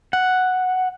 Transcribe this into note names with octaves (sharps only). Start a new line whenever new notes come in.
F#5